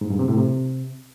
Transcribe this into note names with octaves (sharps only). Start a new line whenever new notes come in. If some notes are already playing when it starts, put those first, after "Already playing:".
G#2
G2
C3
A2
C3